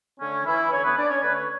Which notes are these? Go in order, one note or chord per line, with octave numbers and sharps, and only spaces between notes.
D3 A3 C#4
E3 E4
D3 A3 C#4 C#5
B3 B4
D4 D5
C#4 C#5
D3 A3 B4
C#5